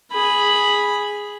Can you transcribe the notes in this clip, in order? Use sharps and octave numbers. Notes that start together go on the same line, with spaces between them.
G#4 B5